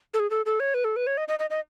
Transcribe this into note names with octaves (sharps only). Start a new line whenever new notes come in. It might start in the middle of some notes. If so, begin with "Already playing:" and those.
A4
G#4
A4
A4
C#5
B4
A4
B4
C#5
D#5
D#5
D#5
D#5